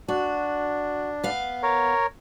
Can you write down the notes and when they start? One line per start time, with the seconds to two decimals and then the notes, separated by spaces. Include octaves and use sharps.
0.08 D4 F#4
1.23 B3 F5
1.63 A#4 C#5